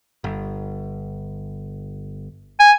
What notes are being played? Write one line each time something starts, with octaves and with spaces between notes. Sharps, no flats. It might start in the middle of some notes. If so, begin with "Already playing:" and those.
G1
G#5